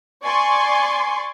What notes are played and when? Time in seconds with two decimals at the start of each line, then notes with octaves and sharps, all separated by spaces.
0.23 D5 G#5 C6 C#6